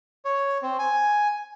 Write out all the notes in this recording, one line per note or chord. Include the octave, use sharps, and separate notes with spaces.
C#5
C4
G#5